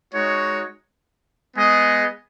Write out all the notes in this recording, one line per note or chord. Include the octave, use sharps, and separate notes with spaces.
G#3 D#4 F#4 C#5
G#3 B3 G#4 D#5